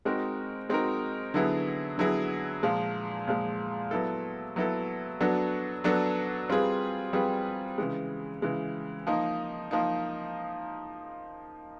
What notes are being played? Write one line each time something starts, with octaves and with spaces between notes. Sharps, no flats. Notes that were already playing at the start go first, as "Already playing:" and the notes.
G#3 C4 D#4 F#4 A#4
G#3 C4 D#4 F#4 A#4
D3 F#3 B3 E4 G#4
D3 F#3 B3 E4 G#4
A#2 F3 G#3
A#2 F3 G#3
F#3 B3 E4 A4
F#3 B3 E4 A4
F#3 B3 D4 F#4 A4
F#3 B3 D4 F#4 A4
G3 C4 F4 G#4 B4
G3 C4 F4 G#4 B4
C#3 E3 G#3
C#3 E3 G#3
F3 A#3 D#4
F3 A#3 D#4